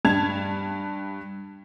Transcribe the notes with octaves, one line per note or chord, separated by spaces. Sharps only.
G2 A5 G#6 F7